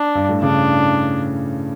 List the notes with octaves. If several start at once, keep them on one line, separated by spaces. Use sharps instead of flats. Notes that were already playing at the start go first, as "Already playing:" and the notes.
Already playing: D4
G2
A2
C#3 D4